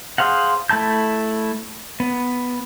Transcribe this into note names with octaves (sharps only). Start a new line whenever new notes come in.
G#4 C5 F5 F#5
A3 E4 A5 G6
B3